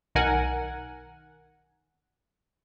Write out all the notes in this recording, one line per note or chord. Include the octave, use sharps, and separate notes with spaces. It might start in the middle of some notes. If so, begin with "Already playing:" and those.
B1 D#3 A#4 F#5 G#5